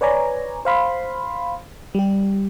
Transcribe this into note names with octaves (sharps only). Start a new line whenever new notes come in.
B4 C#5 D5 G#5 A#5
C5 F5 B5 C6
G3 G4